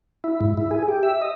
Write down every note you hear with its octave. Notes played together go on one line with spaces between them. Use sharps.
E4
G#2
E4
G#4
G4
E5
D#5